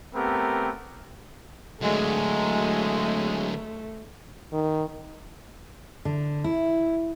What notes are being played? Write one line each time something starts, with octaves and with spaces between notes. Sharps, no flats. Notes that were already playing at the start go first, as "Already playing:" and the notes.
A3 B3 C4 G4 A#4
D3 F#3 G#3 A3
D#3
D3
E4